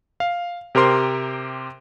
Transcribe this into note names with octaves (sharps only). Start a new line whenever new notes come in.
F5
C3 G4 A#4 C5 C6